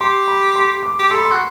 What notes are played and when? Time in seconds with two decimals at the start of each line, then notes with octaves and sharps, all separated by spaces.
0.01 G4 C6
0.28 B5
0.56 C6
0.83 D6
0.99 G4
1.11 A4 C6
1.18 B5
1.25 C6
1.31 F#4